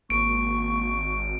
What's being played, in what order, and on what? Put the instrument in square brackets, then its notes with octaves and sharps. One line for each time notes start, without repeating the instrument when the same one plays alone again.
[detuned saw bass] G#1 [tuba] A#3 [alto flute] C#6 [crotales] D7